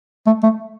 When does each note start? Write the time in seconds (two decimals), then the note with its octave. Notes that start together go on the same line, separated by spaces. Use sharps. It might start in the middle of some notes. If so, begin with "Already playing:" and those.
0.26 A3
0.43 A3